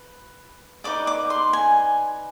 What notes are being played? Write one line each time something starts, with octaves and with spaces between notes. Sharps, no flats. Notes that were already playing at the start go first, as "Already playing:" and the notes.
Already playing: B4
D#4 B4 D5 D6
D6
C6
G#5